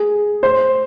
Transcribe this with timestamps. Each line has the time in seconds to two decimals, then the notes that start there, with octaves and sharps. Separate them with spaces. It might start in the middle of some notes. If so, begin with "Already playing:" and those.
Already playing: G#4
0.43 C5